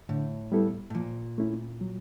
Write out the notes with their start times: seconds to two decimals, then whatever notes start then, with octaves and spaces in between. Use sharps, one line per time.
0.09 A2 D3
0.52 G3 B3 E4 A4
0.90 A2
0.95 A#2 F3
1.38 A3 C#4 E4
1.81 F#3